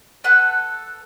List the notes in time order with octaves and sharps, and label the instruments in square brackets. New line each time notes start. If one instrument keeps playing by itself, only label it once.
[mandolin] A4 B4 F#5 F#6